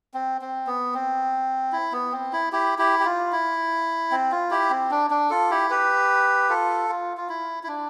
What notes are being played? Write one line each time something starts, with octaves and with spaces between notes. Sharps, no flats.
C4
C4
B3
C4
E4
B3
C4
E4
E4 G4
E4 G4
G4
F4
E4
C4
F4
E4 G4
C4
D4
D4
F4 A4
E4 G4
G4 B4
F4 A4
F4
F4
E4
E4
D4